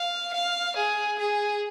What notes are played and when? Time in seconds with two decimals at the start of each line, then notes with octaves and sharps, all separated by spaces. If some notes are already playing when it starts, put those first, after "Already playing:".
Already playing: F5
0.33 F5
0.76 G#4
1.19 G#4